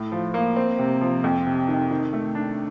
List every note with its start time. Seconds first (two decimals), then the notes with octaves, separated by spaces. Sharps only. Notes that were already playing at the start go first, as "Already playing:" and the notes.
Already playing: A2
0.12 F3
0.34 A#3
0.56 C4
0.79 C3
1.01 F3
1.24 F2
1.46 C3
1.68 D#3
1.91 D#3
2.13 A3
2.35 D4